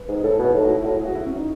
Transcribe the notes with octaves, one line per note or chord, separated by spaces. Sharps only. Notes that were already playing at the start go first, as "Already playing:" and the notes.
Already playing: B4
G#2
G#4
A2 A4
G#4
B2 E4
A2 D#4
F#4
E4
A2 F#4
G#4
F#4
E4
C#4
D#4